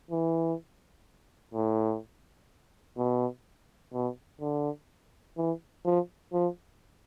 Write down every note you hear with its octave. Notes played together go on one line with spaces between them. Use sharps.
E3
A2
B2
B2
D3
E3
F3
F3